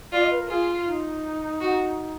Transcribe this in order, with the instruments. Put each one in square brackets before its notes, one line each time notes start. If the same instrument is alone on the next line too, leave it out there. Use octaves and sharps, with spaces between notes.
[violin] F4 [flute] D5
[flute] D#5
B4
A#4
[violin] F4 [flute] G#4
[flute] D#4
[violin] F#4